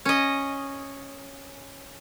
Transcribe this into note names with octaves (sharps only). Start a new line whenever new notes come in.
C#4 D#5